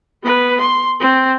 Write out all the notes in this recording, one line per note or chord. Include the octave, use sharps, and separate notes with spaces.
B3 B4
C6
C4